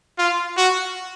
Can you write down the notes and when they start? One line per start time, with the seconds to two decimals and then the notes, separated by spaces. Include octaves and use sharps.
0.18 F4
0.57 F#4